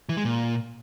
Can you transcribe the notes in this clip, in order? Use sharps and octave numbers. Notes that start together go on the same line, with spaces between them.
E3
G#3
A#2